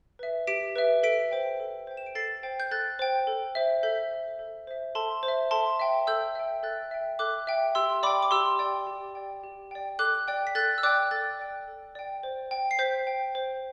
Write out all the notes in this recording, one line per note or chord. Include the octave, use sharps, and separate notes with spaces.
B4 E5
G4 B6 D7
B4 E5
A4 B6 D7
C5 G5
A4
C5 G5
E7
D7
A4 A6 C7
C5 G5
G6
A4 F#6 A6
C5 G5
A4
C5 E5
A4 G6 B6
C5 E5
A4
C5 E5
A4 A5 C6
C5
E5
A4 A5 C6
E5 G5
A4 E6 G6
E5 G5
A4 F#6 A6
E5 G5
A4 D6 F#6
E5 G5
G4 C6 E6
D5 G5 B5 D6
D6
G4 C6 E6
D5 G5
G4
D5 G5
G4
D5 G5
A4 D6 F#6
D5 G5
B6
A4 F#6 A6
E6
D5 G5 D6 F#6
A4 F#6 A6
D5 G5
A4
D5 G5
C5
G5
C7
C5 G6 B6
G5
C5